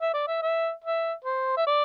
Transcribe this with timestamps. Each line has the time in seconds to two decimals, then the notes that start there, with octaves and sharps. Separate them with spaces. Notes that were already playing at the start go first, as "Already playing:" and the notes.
0.01 E5
0.13 D5
0.28 E5
0.42 E5
0.84 E5
1.24 C5
1.57 E5
1.67 D5